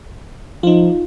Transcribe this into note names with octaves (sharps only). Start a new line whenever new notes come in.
F3 D#4 F4